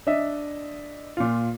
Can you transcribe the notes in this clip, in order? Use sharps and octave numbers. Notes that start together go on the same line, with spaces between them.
D4 D#5 E5
A#2 F4